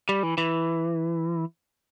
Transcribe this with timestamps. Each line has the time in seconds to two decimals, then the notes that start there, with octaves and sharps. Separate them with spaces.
0.09 G3
0.23 E3
0.38 E3